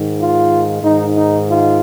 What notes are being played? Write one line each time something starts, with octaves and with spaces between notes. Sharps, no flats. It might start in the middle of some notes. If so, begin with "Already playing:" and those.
Already playing: G#2 D#3
F4
G#2 D#3 D#4
D#4
F4